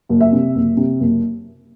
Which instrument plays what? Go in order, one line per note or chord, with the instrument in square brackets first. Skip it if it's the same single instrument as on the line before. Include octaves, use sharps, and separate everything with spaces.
[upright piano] F#1
E5
C3
F#1
C3
F#1